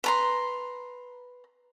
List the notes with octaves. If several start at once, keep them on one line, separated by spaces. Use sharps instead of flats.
B4 A#5 C6